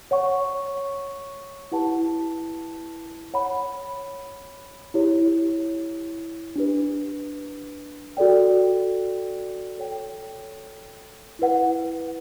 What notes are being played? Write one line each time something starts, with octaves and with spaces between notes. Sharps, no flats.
C#5 F#5 C#6
E4 G4 B4 F#5 A5
C#5 F#5 B5
E4 G4 C#5
D4 G4 B4
F#4 A4 D5 G5
A4 C#5 G5
E4 B4 F#5